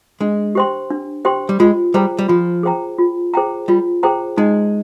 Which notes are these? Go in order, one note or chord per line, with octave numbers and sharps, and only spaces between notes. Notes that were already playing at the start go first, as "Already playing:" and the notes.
G#3 D4
G4 C5 G5 C6
D4
G4 C5 G5 C6
G3
G#3 F4
G3 G#4 C5 G5 A#5
G3
F3 F4
G#4 C5 G5 A#5
F4
G#4 C5 G5 A#5
G3 F4
G#4 C5 G5 A#5
G#3 D#4